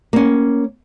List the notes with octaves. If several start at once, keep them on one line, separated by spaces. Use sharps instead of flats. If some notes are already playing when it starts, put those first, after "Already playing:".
A#3 C#4